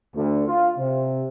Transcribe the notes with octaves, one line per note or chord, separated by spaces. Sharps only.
D2
F4
C3